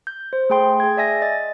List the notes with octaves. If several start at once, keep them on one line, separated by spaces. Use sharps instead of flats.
G6
C5
A3 G#4 G5 C6
G#4 G#6
D5 E5 G#5 A#6
D#5 A6